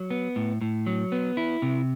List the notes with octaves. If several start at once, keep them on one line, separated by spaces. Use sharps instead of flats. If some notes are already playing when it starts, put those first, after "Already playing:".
Already playing: F#3
B3
A2
A2
F#3
B3
E4
C3